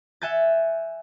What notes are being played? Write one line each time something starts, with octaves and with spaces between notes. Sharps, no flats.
E5 F#5 G#5 G6 A6